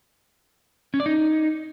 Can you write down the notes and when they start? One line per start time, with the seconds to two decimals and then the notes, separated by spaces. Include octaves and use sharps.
0.94 C#4
1.00 D5
1.06 D#4